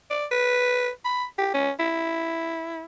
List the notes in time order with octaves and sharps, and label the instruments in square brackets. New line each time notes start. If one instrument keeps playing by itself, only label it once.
[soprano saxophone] D5
B4
B5
G4
C#4
E4